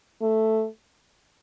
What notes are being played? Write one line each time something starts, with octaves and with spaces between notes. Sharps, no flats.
A3